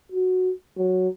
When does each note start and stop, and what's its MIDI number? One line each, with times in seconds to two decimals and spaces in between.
0.12 0.52 66
0.78 1.08 54